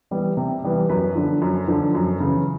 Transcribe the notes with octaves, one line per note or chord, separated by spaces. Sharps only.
E3 G3 B3
C3
E3 G3 B3
F#2 B4
D3 F3
F#2
D3 F3
F#2
C#3 E3